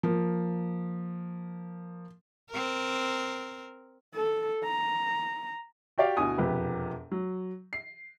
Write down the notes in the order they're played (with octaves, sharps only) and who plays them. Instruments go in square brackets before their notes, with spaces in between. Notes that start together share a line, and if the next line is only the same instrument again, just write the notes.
[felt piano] F3 A#3
[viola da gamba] C4 A#4
[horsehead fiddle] A4
A#5
[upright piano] F#4 G4 D5 F5
D2 B2 E4 G#5 D#6
E1 F2 C3 G4 B4
F#3
C7